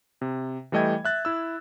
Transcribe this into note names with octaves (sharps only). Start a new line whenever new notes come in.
C3
E3 G3 A3 D#5 G5 G#6
E5 F#6 A6
E4 E6